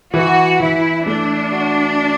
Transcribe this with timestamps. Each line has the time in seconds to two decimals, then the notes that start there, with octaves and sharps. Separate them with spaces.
0.14 E3 F#4
0.60 E3 E4
1.06 A3 D4
1.52 F#4